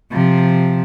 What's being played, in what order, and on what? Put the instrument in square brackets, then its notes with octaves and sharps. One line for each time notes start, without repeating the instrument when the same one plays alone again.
[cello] C3 F3